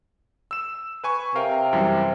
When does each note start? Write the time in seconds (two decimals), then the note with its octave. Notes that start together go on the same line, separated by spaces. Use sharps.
0.51 E6 E7
1.04 B4 G#5 C#6
1.35 C3 A#4 F5 G5
1.73 F#2 E3 G3